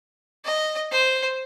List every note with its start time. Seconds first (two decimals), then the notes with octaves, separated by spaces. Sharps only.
0.45 D#5
0.92 C5